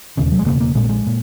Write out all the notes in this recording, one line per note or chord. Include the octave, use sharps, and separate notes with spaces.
E1 D#2 C#3
F#3
G#3
E1 D#2 C#3 A#3
A#3
A#1 A#2 G#3
A#3
G#3
A#2